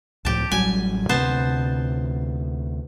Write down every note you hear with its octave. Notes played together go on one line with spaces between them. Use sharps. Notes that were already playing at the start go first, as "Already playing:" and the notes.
C#2 A2 F3 G4 A5
A1 F#3 G3 G#5
D2 C3 B3 C5 A5